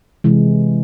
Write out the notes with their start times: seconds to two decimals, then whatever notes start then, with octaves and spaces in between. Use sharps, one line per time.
0.24 C3 E3 G#3